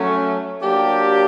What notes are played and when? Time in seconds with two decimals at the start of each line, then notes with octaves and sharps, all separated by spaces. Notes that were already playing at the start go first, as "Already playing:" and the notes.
Already playing: F#3 A3 C#4
0.62 F#3 A#3 D4 G4